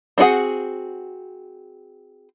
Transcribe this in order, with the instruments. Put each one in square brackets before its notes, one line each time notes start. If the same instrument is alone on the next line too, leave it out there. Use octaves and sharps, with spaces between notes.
[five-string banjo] C4 D4 F#4 G#4 F#5